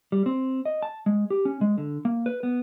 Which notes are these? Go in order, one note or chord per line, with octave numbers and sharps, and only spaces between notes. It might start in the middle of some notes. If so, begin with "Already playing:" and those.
G3
C4
D#5
A5
G#3
G4
C#4
G#3
D3
A#3
B4
B3